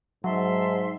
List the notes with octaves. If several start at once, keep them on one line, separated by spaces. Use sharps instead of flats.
G#2 F#3 E5 A5 C6